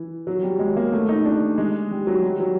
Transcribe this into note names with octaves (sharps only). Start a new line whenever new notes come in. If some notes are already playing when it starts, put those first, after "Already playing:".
Already playing: E3
F#3
G3
G#3
A#3
A3
D#4
D4
G#3
G3
F#3
G3
F#3